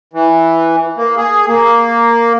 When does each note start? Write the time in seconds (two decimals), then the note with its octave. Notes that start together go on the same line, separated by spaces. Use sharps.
0.13 E3
0.97 A#3
1.17 G#4
1.47 A#3